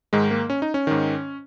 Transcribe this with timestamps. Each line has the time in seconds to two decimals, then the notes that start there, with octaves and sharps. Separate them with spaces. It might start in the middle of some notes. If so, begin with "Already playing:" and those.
0.13 G#2 D#3 G#3
0.31 A#3
0.50 C#4
0.62 D#4
0.74 C#4
0.87 G#2 D#3